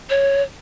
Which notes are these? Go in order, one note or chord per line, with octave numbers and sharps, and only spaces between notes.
C#5